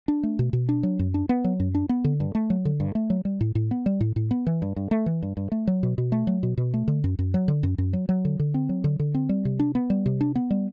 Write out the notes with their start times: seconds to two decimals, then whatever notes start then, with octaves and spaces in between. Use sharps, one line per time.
0.08 D4
0.23 A3
0.39 B2
0.53 B2
0.69 D4
0.83 F#3
0.99 F#2
1.14 D4
1.29 B3
1.44 F#3
1.60 F#2
1.75 D4
1.89 B3
2.04 D3
2.20 G2
2.35 A3
2.50 F#3
2.65 D3
2.80 G2
2.95 A3
3.10 F#3
3.25 G3
3.41 A2
3.55 A2
3.71 B3
3.86 G3
4.01 A2
4.16 A2
4.31 B3
4.47 E3
4.62 G2
4.76 G2
4.91 A3
5.06 E3
5.23 G2
5.37 G2
5.52 A3
5.67 F#3
5.83 B2
5.98 B2
6.12 A3
6.27 F#3
6.43 B2
6.58 B2
6.74 A3
6.88 D3
7.04 F#2
7.19 F#2
7.34 F#3
7.48 D3
7.63 F#2
7.78 F#2
7.93 F#3
8.09 F#3
8.25 D3
8.39 D3
8.54 C4
8.69 F#3
8.84 D3
8.99 D3
9.14 C4
9.29 G3
9.45 C3
9.59 D4
9.75 B3
9.90 G3
10.06 C3
10.21 D4
10.35 B3
10.51 G3